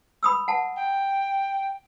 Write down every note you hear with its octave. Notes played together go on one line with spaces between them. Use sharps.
B5 D#6 E6
F#5 A5
G5